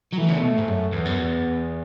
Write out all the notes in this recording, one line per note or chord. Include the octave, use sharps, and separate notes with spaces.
F#3
E3 A3
C#3
B2
A2
G#2
F#2
E2 B3
F#2
E2